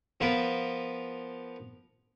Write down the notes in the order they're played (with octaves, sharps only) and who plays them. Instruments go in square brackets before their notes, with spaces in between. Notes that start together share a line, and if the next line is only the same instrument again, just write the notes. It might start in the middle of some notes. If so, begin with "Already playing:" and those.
[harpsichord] F3 B3 A#4 B4